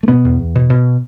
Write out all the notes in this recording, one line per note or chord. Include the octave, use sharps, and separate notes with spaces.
A3
B2 B3
E2
E2
B2
B2